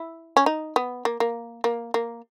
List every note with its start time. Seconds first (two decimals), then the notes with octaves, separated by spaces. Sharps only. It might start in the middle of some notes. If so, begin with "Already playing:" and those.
Already playing: E4
0.37 C#4
0.46 D#4
0.76 B3
1.05 A#3
1.20 A#3
1.64 A#3
1.94 A#3